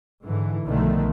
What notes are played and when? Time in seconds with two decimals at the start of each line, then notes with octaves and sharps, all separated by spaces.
0.23 G#2 D3 E3
0.65 B1 B2 D3 D#3 F3 A3